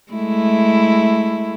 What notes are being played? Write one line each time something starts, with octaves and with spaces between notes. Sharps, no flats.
G#3 A3 E4